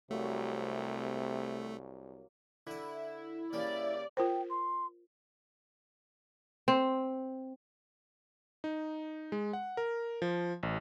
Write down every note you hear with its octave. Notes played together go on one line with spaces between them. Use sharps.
C2 C3 F#3 A3 A#3 C#6
D3 E4 D5
C#3 G3 A#3 D5
F4 A#4 C5 G5
C6
C4
D#4
G#3
F#5
A#4
F3
A1